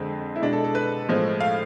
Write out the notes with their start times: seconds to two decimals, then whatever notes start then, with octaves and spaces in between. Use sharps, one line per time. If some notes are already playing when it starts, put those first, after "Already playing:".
Already playing: F2 D3 G#3 C4
0.36 E4
0.42 B2 G#3 D4
0.53 A4
0.64 A4
0.75 B4
1.09 A2 F3 G#3
1.41 F5